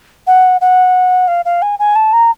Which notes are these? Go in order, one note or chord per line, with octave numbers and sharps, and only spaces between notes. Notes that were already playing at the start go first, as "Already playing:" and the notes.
F#5
F#5
F5
F5
G#5
G#5
A5
A#5